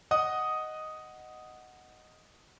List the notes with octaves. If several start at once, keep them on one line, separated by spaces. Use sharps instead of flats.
D#5 F#5 D#6